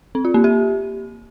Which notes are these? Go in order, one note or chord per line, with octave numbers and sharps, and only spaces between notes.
C4
F4
A#3
G4